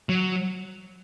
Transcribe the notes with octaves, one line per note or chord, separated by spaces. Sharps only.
F#3